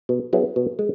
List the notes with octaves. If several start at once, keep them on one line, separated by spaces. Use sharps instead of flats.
B2
F#3 B3 E4 G#4
B2
G#3